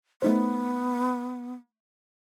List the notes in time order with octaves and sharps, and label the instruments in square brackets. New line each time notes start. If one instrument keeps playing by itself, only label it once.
[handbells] A3 D#4 C5 [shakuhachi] B3